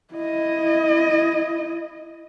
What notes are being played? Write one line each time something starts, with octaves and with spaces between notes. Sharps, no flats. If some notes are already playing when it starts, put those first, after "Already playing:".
E4 D#5